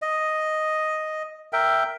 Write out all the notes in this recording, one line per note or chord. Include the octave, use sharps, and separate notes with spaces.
D#5
A#4 E5 G5